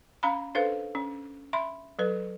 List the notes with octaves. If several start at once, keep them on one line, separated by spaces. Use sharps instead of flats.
C#4 F5 A#5 B5
D4 A4 B4 C5 F5
C#4
E5 B5 C6
F#3 A4 B4